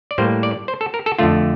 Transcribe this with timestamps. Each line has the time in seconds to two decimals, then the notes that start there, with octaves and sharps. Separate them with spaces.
0.11 D5
0.18 A2 G3 A#3 C5
0.43 D5
0.68 C5
0.81 A4
0.94 A#4
1.06 A4
1.19 F2 D3 A3 F4